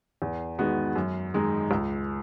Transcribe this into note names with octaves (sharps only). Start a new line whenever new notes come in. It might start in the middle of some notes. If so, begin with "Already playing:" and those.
E2
D#3 G#3 B3 F#4
F#2
D#3 G#3 D#4
C#2